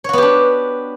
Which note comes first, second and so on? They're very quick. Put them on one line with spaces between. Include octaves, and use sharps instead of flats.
C#5 F#4 B3 G4 D4